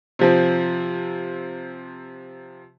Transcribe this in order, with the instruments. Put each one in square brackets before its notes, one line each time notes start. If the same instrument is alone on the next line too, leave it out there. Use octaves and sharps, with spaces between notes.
[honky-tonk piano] C3 F3 C4